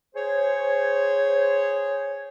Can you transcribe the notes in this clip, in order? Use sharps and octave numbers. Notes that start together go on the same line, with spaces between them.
G#4 C5 C#5